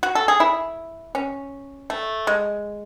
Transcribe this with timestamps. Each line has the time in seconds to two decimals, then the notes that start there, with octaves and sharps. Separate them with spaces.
0.03 F#4
0.15 A4
0.28 G#4
0.40 E4
1.15 C#4
1.90 A3
2.27 G#3